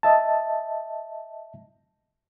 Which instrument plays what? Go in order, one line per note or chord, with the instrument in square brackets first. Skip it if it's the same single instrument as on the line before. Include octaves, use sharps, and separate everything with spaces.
[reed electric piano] D#5 E5 A5